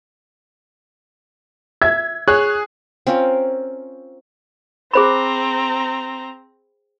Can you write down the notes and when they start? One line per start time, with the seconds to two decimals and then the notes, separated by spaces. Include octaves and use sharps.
1.82 E5 G#6
2.28 G#4 C#5 F#6
3.07 C4 C#4 F4 A#4
4.93 C4 G#4 C5 A#5 B5